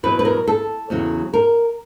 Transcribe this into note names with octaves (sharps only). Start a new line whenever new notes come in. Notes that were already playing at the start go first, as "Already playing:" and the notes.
E2 B2 F#3 B4
B4
A#4
A4
E2 C#3 F#3
A#4